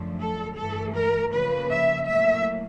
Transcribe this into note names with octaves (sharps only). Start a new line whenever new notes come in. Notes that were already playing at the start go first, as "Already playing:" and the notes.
Already playing: F#2 D3 F3 A3
A4
G2 E3 A3 A4
A#4
C#3 F3 A#3 B4
E5
A2 F#3 A#3 E5